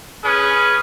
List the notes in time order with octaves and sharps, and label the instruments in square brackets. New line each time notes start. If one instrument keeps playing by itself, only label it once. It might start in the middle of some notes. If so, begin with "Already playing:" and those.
[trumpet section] C#4 G#4 B4